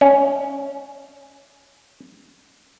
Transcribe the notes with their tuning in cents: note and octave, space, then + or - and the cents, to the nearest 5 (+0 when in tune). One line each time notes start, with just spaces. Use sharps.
C#4 +5